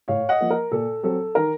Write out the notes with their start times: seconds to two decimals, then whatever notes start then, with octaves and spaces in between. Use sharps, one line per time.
0.08 A2 C#5 F5
0.29 D#5 F#5
0.41 F3 A#3
0.50 A#4
0.72 A#2 A4
1.03 F#3 C4 A4
1.35 D#3 A#4